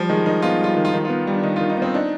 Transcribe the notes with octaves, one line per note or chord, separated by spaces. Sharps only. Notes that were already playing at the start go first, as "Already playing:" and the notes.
Already playing: F3 G3
D#3 G#3
D#3 D#4
B3 F4
G3 F4
D#3
F4
D#3
B3 F4
G3
D4
D#3 D#4
D#3 F4
D#4
B3 C4
D4 D#4